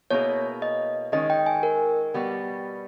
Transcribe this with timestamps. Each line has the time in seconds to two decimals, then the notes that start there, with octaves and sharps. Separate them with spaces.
0.10 B2 A#3 C#4 E4 G#4 C#5
0.62 D#5
1.12 D#3 G#3 C#4 D#5
1.30 G5
1.46 G#5
1.63 A#4
2.14 B2 G3 B3